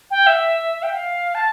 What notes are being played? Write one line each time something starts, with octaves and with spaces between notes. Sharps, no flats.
G5
E5
G5
F5
A5